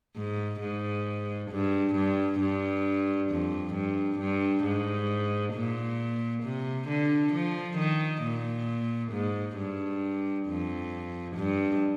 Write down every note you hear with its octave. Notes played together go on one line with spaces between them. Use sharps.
G#2
G#2
G2
G2
G2
F2
G2
G2
G#2
A#2
C3
D3
F3
D#3
A#2
G#2
G2
F2
G2